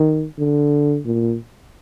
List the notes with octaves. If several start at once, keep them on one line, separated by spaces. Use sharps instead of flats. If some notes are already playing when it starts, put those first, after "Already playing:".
Already playing: D#3
D3
A#2